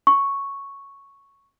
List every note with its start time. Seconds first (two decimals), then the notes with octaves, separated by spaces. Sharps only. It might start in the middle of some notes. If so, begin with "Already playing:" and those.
0.07 C#6